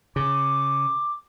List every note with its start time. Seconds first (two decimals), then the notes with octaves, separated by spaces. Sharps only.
0.16 C#3 D6